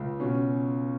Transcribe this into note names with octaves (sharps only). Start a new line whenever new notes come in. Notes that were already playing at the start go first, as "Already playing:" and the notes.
Already playing: C#2
B2 C#4